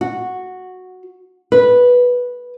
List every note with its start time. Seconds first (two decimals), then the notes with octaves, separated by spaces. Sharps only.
0.01 F#4
1.52 B4